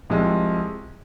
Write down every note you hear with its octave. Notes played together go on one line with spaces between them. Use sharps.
C2 C3 F3 G#3